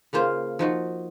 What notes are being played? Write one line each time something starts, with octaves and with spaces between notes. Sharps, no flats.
C#3 A#3 F4 C5
F3 D#4 F#4